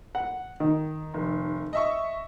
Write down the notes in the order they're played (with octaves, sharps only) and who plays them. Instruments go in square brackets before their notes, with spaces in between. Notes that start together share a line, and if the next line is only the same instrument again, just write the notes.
[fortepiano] F#5
D#3
[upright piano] F1
D#5 E5 C#6